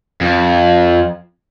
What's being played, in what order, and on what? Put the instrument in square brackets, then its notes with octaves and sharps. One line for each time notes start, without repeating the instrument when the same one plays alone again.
[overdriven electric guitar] F2